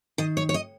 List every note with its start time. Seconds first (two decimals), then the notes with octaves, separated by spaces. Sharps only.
0.18 D#3 D#5
0.37 C#5
0.49 C#5
0.54 D#5